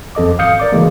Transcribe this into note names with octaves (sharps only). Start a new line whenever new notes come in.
F2 A4 D#5 D6
G#1 F5 D#6 G6 C#7
A#4 D5 D6
C#3 E3 G#3 A#3